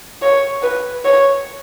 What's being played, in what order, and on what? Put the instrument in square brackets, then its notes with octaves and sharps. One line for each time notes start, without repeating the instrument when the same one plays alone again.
[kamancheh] C#5
B4
C#5